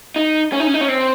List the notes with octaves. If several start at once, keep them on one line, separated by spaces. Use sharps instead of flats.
D#4
C#4
D#4
C#4
D#4
C#4
C4